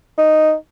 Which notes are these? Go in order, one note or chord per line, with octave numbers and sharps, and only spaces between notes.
D#4